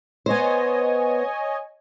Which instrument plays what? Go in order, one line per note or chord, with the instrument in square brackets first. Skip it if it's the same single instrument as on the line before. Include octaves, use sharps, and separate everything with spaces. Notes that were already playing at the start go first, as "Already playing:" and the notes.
[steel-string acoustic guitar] B3 C5 [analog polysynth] C#5 D#5 G#5